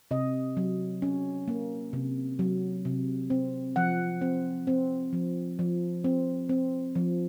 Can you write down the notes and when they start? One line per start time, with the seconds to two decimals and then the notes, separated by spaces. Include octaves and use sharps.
0.11 C3 D#5
0.57 F#3
1.02 C#4
1.48 A#3
1.93 C3
2.39 F#3
2.85 C3
3.30 C4
3.76 F3 F#5
4.21 C4
4.67 C4
5.13 F3
5.59 F3
6.04 C4
6.49 C4
6.95 F3